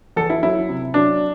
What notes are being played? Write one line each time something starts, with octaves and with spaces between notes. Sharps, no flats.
E2 A4
E4
F#3 E4
C3
F#3 D4